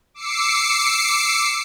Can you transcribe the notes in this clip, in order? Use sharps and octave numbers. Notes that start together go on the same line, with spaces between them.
D6 E6 C7 C#7